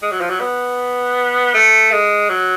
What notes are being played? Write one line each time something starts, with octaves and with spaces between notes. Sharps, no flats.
G#3
F#3
F3
F#3
B3
A3
G#3
F#3